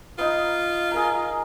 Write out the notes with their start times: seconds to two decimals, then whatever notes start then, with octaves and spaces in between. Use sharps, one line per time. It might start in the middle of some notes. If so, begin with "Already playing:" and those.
0.18 B3 D#4 F4
0.92 G#4 A#4 A#5